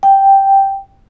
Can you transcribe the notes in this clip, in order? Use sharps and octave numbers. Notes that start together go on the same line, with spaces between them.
G5